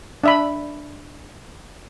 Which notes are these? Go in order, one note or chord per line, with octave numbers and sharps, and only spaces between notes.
D4 E5 B5